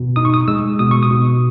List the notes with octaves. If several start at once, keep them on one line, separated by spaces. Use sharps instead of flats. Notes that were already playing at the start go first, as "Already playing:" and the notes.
Already playing: B2
D#4 D#6
C#6
D#6
G#3 E6
B2 D#6
C#6
D#6
B2